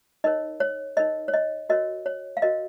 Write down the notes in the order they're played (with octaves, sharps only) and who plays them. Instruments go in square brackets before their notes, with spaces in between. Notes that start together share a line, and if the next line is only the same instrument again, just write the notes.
[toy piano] D#4 A#4 C#5 D#5
C#5
D#4 A#4 C#5 D#5
C#5
D#5
F#4 A#4 C#5 D#5
C#5
F5
F#4 A#4 C#5 D#5